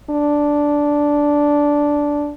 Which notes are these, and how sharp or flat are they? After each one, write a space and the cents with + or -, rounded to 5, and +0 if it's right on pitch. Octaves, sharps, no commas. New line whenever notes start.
D4 -5